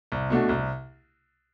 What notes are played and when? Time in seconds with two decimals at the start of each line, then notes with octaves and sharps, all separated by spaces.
0.12 C2
0.30 B2 A3 D4 F#4
0.49 C2